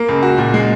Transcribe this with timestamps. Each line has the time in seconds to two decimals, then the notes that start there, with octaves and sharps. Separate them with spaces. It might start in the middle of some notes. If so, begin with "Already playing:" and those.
Already playing: A#3
0.09 C#2
0.23 F#4
0.38 A#2
0.54 G#3